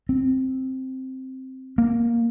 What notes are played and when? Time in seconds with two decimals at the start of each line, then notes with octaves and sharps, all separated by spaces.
0.09 C4
1.78 A#3